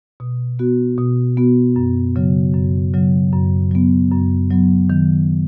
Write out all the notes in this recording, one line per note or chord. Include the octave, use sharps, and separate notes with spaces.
B2
B3 F#4
B2
B3 F#4
F#2
C#3 F#3
F#2
C#3 F#3
F#2
F#3 B3
F#2
F#3 B3
D#3